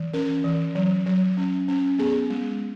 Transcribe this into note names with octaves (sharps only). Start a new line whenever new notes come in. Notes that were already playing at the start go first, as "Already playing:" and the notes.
Already playing: E3
C#4 A#4
E3
F#3
F#3
C#4
C#4
B3 G#4
G#3